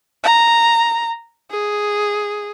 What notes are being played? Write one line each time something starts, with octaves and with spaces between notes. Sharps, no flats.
A#5
G#4